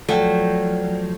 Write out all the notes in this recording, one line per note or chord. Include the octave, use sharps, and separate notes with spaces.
F3 F#3 A3 D5 F#5 G5